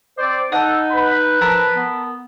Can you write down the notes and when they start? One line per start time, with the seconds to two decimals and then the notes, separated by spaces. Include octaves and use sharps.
0.18 C4 C5 D5
0.52 D#4 A4 D#5 F#5 F#6
0.91 B4 B5
1.41 F3 A4 A#4 A5
1.76 B3